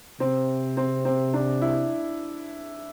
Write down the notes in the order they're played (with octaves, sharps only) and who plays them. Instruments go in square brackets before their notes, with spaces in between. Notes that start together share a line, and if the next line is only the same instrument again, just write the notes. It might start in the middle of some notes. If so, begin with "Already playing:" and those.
[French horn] C3 [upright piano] C4
[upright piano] C4
C4
D4
E4